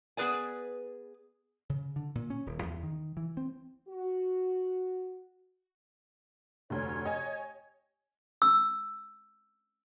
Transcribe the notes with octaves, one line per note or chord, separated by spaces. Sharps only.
B3 G#4 B4 D5 G#5
C#3
D3
A#2
C#4
D#1
E2
D#3
E3
C4
F#4
F1 D2 C#5
G4 D#5 G#5
E6